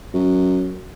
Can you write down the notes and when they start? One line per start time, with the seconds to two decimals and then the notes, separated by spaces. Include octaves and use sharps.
0.14 F#2